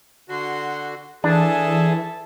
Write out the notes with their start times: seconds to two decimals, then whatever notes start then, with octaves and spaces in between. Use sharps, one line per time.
0.29 D3 F#4 C6
1.24 E3 D4 G#4 A4 E5 A5